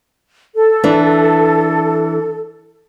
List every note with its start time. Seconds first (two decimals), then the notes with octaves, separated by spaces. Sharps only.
0.55 A4
0.84 E3 D4